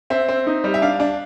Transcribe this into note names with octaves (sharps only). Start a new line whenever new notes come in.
C4 E5
C4
D#4
G3
E5
D4 F5
D4